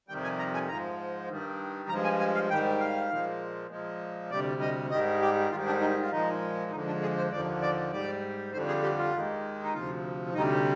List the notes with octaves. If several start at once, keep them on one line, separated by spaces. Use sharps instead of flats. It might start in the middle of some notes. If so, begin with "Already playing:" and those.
F2 C3 D#3 G3 G5
G#5
A#5
G#5
G#2 F3 G#3 A#5
G2 D#3 G3
G2 F3 G#3 A#5
G#5
G#5
F5
G#2 D#3 G3 G5
F5
A#2 F3 G#3
A#2 F3 G#3
D2 C3 G3 D5
D#5
G#2 D#3 G3 D#5
G4
G#2 D#3 G3 F4
D4
D#4
F4
A#2 F3 G#3 D#4
F2 D3 F3 G#3 D#4
D4
G#4
C5
D#2 D3 F3 D5
D5
G#2 G3 D5
F2 D3 G3 C5
G#4
G4
F4
D#2 D#3 G#3
D#4
D2 C3 F3 F4
D2 C3 G3 D#4